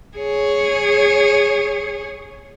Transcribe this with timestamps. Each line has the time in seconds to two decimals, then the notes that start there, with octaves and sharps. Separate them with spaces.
0.17 G#4 C#5